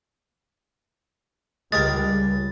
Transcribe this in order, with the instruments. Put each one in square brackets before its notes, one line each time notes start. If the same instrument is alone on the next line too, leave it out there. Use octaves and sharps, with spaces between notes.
[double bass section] C#2 G3 [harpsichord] G#3 G4 A#4 [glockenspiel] A6